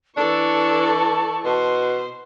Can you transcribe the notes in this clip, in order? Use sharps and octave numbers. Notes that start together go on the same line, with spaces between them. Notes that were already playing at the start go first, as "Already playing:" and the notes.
E3 D4 A4 D5 A5 C#6
B2 C5